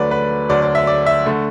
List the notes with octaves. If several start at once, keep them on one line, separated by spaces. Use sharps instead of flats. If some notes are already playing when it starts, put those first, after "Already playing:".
Already playing: D2 D3 F#3 A3 B4 D5
B4
D2 D3 F#3 D5
D5
E5
D5
E5
D3 A3